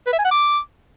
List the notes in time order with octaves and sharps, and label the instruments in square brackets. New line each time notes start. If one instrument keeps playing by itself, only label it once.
[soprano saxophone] B4
E5
G#5
F#5
D6